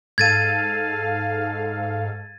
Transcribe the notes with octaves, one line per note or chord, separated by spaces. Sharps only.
G#2 A4 F5 G#6 A6 D#7